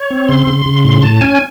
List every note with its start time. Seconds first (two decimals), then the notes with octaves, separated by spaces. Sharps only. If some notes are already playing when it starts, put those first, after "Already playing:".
Already playing: C#5
0.11 C4
0.28 C#3 C6
0.47 C#3
0.66 C#3
0.84 A2 C6
1.02 A2 A5
1.21 C#4 G#5